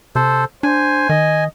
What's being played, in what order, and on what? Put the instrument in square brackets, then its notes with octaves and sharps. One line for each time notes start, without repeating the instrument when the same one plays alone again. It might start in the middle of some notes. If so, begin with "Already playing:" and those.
[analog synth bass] C3 [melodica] A4 C5
[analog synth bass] D4 [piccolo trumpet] C5 [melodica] G#5
[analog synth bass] D#3 [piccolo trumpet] D#5